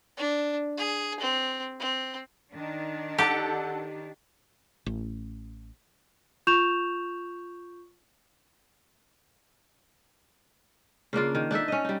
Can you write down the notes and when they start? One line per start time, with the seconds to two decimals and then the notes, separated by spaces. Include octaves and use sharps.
0.17 D4
0.78 G#4
1.20 C4
1.80 C4
2.53 D#3 D4
3.18 G4 A4 F#5 A5
4.86 A1
6.47 F4 C#6 G6 E7 F7
11.13 C#3 A#3 D4 F4
11.35 D#3
11.51 D4 D#4 A4 E5
11.68 C#4 D#5
11.85 G3 D#4